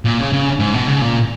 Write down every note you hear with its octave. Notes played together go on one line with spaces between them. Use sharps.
A#2
C#3
C#3
G#2
B2
C#3
A#2